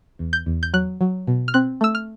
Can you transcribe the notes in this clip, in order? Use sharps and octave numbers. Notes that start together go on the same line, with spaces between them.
E2
G6
E2
G6
F#3 F#6
F#3
B2
F6
C4 F#6
A3 E6
F6